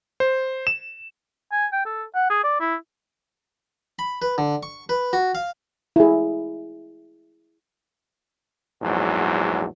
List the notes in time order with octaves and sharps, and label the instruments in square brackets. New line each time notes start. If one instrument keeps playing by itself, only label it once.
[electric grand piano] C5
E7
[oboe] G#5
G5
A4
F#5
G#4
D5
E4
[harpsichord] B5
B4
D3
C#6
B4
F#4
F5
[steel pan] E4 G#4
[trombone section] A#1 E2 G#2 F#3